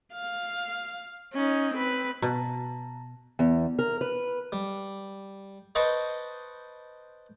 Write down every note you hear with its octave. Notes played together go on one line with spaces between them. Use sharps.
F5
C#4 D#4
C4 B4
B2 A5 A#5
E2
A#4
B4
G3
B4 C5 D#5 G5 A5 C#6